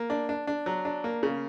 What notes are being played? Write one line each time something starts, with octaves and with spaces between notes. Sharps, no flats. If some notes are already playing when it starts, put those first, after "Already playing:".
Already playing: A#3
D4
D4
D4
F#3
D4
A#3
C#3